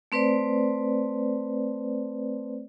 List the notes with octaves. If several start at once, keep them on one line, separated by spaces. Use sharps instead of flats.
A3 C4 B4 C5 D5